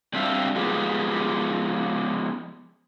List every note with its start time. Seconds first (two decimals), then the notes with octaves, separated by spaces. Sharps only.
0.13 G3 C4 D4 G4 E5 F5
0.55 F3 G#3 B3 G4